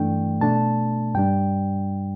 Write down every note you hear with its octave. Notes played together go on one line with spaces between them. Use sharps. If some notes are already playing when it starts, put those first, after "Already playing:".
Already playing: G2 E3 A3 D4 G5
B2 A3 D4 A5
G2 G3 D4 G5